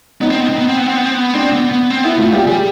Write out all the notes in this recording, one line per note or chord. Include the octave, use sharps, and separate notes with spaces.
B3 D#4
C4
B3
C4
B3
C4
B3
C4
B3
C4
B3
C4 D4
B3
B3
C4
B3 E4
A3 F4
G3 G4
G3 G#4